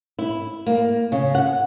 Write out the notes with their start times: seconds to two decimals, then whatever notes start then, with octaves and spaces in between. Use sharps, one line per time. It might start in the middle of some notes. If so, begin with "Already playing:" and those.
0.19 E4
0.66 A#3
1.12 C#3
1.35 F#5